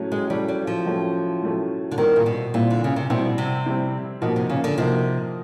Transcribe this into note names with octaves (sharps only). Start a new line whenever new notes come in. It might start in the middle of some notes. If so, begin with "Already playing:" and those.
Already playing: A2 F#3 A3 C#4
G#3
A2 F#3 G3 A3 C#4
G3
F3
A2 F#3 A3 C#4
A2 F#3 A3 C#4
D3
D#3 G3 C4 E4
A#2
B2
A#2 G3 C4 E4
D3
C#3
C3
B2 G3 C4 E4
C3
G3 C4 E4
B2 F3 A#3 D#4 F#4 A#4
C3
C#3
D3
C3 F3 A#3 D#4 F#4 A#4